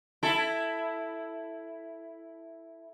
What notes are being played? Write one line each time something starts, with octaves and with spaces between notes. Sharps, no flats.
E4 A4